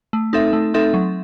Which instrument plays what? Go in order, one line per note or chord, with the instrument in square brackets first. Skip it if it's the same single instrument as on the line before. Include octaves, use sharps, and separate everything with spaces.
[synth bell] A3
C4 D#4 A4 E5
A3
C4 D#4 A4 E5
F#3